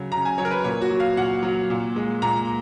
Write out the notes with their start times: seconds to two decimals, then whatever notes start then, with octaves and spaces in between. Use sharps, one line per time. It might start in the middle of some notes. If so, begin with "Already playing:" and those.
Already playing: C#3 F#3
0.12 C#3 A#5
0.25 G#5
0.38 F#3 C#5
0.45 A#4
0.51 B4
0.64 A#2 C#5
0.81 F#4
0.90 F#3
1.00 F5
1.17 A#2 F#5
1.43 F#3
1.70 A#2
1.96 G#3
2.22 A#2 A#5